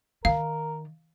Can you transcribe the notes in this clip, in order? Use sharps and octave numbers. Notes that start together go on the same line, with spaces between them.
D#3 A#4 F5